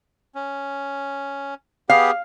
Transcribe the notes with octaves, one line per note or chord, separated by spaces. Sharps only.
C#4
B3 G4 G#4 F5